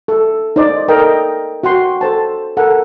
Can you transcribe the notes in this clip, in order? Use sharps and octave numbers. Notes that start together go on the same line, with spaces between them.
A4
D#4 C5 D5
A4 A#4 D#5 G5
F#4 F#5 G5 C6
A4 C5 A5
A4 A#4 F#5